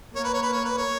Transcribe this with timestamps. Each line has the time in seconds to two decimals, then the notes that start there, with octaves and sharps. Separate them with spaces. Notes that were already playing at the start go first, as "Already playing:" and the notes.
0.15 A#3 C#5
0.24 B4
0.34 C#5
0.43 B4
0.53 C#5
0.64 B4
0.77 C#5